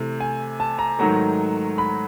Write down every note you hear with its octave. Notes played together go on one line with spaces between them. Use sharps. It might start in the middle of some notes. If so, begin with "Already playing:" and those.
Already playing: C3 E3 A3
G#5
A5
A#5
G#2 D#3 F#3 A3 A#5
B5